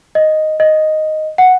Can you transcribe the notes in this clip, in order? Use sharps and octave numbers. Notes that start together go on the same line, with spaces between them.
D#5
D#5
F#5